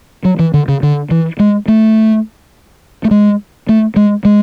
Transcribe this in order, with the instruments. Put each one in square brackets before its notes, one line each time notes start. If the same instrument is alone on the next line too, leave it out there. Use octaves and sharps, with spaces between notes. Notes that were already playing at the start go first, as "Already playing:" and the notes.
[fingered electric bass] F#3
E3
D3
C#3
D3
E3
G#3
A3
A3
G#3
A3
G#3
G#3